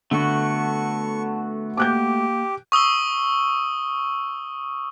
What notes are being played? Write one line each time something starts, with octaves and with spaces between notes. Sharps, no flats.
D3 A3 B3 F#4 A5 C#6
A#3 G4 D6 F#6 G6
C#6 D#6 E6 G7